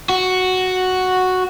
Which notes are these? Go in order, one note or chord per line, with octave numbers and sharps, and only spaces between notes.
F#4